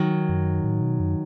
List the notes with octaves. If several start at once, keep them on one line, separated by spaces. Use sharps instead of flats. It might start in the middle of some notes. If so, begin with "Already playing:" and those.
Already playing: D#3 F#3
F#2
A2
B2
F#2